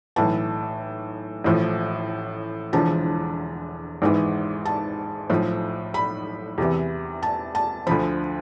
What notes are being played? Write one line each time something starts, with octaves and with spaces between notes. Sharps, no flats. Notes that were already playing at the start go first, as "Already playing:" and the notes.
B1 A2 E3 A5
A1 A2 F3
E1 E2 D3 F3 A5
G#1 G#2 E3
A5
B1 A2 F3
B5
E2 C3 E3
A5
A5
D2 D3 F3 B5